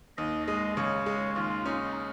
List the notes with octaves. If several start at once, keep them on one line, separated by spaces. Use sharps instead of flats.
D#2 D#5
G#3 D#5
C#3 C#5
G#3
D#2 F4
C#4 D#4